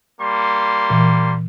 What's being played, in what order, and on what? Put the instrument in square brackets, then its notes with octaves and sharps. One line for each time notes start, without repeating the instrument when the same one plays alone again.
[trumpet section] G3 A#3 C6
[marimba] A#2 E3